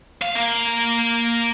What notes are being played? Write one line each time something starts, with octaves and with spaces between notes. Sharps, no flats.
F5
A#3